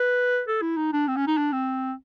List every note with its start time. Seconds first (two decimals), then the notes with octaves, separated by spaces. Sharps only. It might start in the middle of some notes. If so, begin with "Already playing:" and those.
Already playing: B4
0.48 A4
0.62 E4
0.77 D#4
0.93 D4
1.08 C4
1.17 C#4
1.27 D#4
1.37 D4
1.52 C4